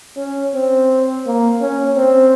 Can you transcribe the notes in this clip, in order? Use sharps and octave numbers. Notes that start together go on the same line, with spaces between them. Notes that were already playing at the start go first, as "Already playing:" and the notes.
C#4
C4
A#3
C#4
C4